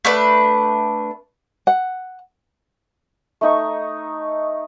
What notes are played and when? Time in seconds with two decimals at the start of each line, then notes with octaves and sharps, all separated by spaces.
0.05 A3 D4 B4
1.67 F#5
3.41 A3 D#4 C#6